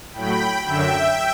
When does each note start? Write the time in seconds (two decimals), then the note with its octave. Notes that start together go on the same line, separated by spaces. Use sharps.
0.13 A2 F#3 G5 B5
0.64 F#2 D3 F#3 E5 G5